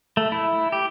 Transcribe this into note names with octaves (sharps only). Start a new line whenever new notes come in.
A3
E4
G4